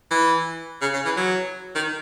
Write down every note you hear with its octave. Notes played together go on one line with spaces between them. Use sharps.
E3
C#3
C#3
E3
F#3
D#3